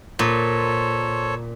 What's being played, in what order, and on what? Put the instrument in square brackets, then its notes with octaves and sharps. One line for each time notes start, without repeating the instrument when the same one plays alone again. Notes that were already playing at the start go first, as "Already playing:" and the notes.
[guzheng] A#2 [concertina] A4 C5 C#5